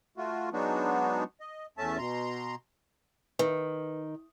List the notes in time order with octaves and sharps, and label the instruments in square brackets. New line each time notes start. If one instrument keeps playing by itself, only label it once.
[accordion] A3 F4 F#4
F#3 G#3 B3 D4 D#4 F#4
D#5
E2 A3 C#4 E5 A5
B2 A#5 C6
[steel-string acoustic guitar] D#3 [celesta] B4